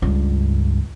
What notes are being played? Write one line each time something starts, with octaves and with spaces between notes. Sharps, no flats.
C#2 G2